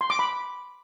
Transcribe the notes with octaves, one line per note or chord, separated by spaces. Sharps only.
C6
D6
B5